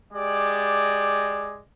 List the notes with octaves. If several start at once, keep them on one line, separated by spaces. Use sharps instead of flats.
G#3 G4 D5